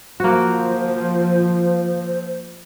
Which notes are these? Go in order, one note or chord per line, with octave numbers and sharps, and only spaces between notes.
F3 A#3 F#4 C5